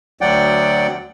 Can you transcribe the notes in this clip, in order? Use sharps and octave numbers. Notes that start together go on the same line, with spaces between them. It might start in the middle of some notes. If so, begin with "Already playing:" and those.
D2 F#3 D5 F#5 G5